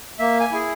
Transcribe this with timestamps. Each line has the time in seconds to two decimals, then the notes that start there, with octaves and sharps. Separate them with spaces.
0.19 A#3 E5
0.40 G#5
0.52 E4 G#4